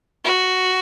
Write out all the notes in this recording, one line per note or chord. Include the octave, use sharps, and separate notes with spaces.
F#4